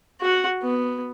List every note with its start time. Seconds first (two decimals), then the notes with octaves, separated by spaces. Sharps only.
0.21 F#4 F#5
0.62 B3